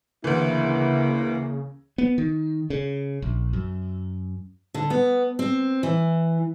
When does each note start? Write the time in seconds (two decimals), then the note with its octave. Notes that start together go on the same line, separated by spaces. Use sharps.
0.24 D2 C#3 E3 A#3 E4
1.98 B3
2.18 D#3
2.70 C#3
3.22 A#1
3.53 F#2
4.74 D3
4.90 B3
5.39 C4
5.83 E3